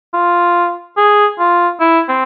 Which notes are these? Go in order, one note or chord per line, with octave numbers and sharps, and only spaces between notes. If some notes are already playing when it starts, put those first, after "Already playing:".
F4
G#4
F4
E4
C4